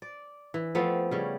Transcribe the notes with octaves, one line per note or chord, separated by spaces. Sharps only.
D5
E3
F3 A3 B3 C4
C#3 G3 C#4